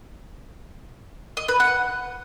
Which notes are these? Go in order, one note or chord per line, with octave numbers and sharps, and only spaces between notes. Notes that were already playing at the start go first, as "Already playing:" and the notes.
D#5
B4
F#5